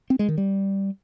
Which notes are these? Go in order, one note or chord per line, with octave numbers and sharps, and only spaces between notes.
C4
G#3
D#3
G3